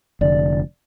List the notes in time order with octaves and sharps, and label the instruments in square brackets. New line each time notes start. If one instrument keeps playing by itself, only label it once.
[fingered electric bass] F1 D3 [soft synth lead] D5